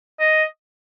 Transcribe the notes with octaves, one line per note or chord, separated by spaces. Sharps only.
D#5